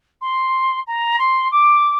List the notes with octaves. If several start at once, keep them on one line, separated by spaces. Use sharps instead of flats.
C6
A#5
C6
D6